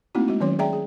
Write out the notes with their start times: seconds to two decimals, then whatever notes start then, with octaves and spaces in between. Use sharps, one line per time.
0.15 A3 A#3 C4 D#4 E4 F#4
0.28 G#3 F#4
0.40 D#3 F#3 C#4 C#5 C6
0.59 G#4 D5 E5 G5 A#5
0.73 G#4